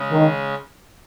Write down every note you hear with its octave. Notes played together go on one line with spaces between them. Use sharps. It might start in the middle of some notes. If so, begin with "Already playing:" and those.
Already playing: C#3 G#3 C#4
D#3